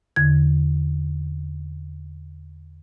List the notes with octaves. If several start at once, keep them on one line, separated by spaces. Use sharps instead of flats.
E2 D3 G#6